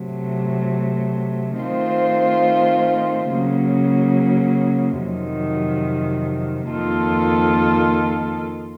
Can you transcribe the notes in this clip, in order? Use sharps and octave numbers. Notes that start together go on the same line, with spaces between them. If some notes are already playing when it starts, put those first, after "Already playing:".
Already playing: C3 F#3 A3
D#3 A3 C4 F4 C5
C#3 F#3 A#3
F2 C3 D#3 F#3
F2 D#3 A#3 F4 A4